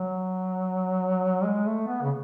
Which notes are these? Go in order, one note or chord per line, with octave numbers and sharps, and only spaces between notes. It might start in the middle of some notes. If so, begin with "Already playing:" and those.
Already playing: F#3
G#3
A3
B3
C#3